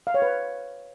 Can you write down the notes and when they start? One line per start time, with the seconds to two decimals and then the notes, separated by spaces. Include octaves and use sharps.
0.07 F5
0.14 C#5
0.22 B4